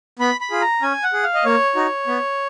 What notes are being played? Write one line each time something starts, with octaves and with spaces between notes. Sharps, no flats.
B3 B5
B5
F4 G#4
A#5
C#4 G#5
F#5
G#4
F5
D#5
A#3 C#5
D#4 F#4
B3